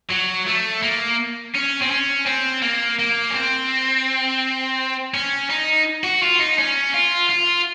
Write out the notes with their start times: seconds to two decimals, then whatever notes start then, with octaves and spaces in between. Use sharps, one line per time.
0.11 F#3
0.47 A3
0.83 A#3
1.55 C#4
1.82 C4
1.91 C#4
2.26 C4
2.62 A#3
2.99 A#3
3.30 C#4
3.34 C4
5.14 C#4
5.50 D#4
6.04 F#4
6.23 F4
6.39 D#4
6.58 C#4
6.94 F4
7.30 F4